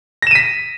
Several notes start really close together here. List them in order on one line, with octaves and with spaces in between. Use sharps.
A#6 E7 D#7 B6